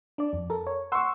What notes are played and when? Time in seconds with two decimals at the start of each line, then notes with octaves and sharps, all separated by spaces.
0.18 D4 D5
0.33 F2
0.50 A4 A#4
0.67 C#5
0.92 F#5 C6 C#6 E6